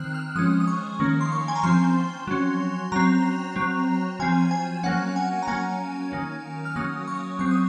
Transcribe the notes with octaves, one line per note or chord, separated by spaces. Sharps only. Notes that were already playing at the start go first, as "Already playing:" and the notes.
Already playing: D#3 C4 F6 F#6
F6
F3 G#3 C#4 D#6
D#6
C#6
D#3 A#3 C#4
C6
C#6
G#5
A#5
F3 C4 C6
F#3 C#4
F#3 C4 A#5
F#3 C4
F3 C4 G#5
G#5
F#3 A#3 C#4 F#5
G#5
A#5
F#3 A#3 C#4 G#5
D#3 A#3 C#4
F6
F#3 A#3 C#4 D#6
C#6
F#3 C4 C#6
D#6